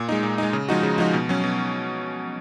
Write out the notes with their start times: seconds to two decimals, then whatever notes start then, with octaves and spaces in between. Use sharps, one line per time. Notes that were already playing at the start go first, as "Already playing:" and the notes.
Already playing: A#2
0.09 G#3 D#4
0.23 A#2
0.38 G#3 D#4
0.53 C#3
0.69 F3 G#3 D#4 F#4
0.83 C#3
0.98 F3 G#3 D#4 F#4
1.13 B2
1.29 F#3 C#4
1.44 B2